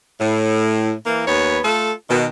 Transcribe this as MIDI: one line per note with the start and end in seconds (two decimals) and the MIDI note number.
0.20 0.93 45
1.06 1.24 52
1.06 1.24 58
1.27 1.59 39
1.27 1.59 59
1.27 1.59 71
1.27 1.59 73
1.64 1.92 57
1.64 1.92 65
1.64 1.92 69
2.10 2.26 47
2.10 2.26 51